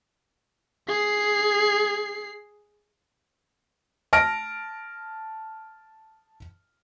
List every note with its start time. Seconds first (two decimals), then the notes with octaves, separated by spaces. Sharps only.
0.88 G#4 C7
4.13 A5 F6 A#6 D7